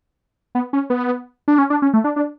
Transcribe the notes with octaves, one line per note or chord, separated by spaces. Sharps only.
B3
C#4
B3
D4
C#4
D4
C#4
A3
D4
D4